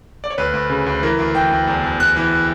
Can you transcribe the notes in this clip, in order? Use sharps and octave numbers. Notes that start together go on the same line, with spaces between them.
D5
C#5
D2 B4
D2
C#3
D2
E3 A#4
D2
E3 G5
D2
E2
E2
E2 F#6
E3